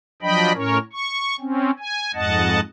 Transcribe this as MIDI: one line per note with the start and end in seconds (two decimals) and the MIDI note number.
0.22 0.52 53
0.22 0.52 54
0.22 0.52 62
0.22 0.52 75
0.22 0.52 79
0.22 0.52 83
0.54 0.78 45
0.54 0.78 61
0.54 0.78 70
0.54 0.78 73
0.93 1.36 85
1.40 1.71 60
1.40 1.71 61
1.79 2.11 80
2.14 2.60 41
2.14 2.60 44
2.14 2.60 75
2.14 2.60 78
2.14 2.60 81